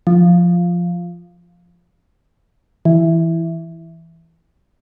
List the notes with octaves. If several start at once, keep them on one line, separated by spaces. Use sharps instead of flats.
F3
E3